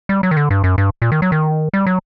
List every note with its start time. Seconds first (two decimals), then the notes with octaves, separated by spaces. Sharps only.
0.09 G3
0.23 F#3
0.31 D#3
0.37 D3
0.50 G2
0.64 F#2
0.78 G2
1.02 A#2
1.12 D#3
1.22 F#3
1.32 D#3
1.73 G3
1.86 F#3